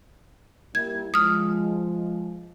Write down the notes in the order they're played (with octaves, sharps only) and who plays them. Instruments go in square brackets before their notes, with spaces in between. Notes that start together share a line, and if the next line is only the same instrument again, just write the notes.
[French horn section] G3 A#3 E4 [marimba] G#6
[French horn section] F3 G#3 [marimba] D#6 F6